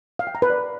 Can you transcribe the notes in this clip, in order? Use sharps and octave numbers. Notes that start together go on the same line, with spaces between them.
F5
G5
A#5
B4
D5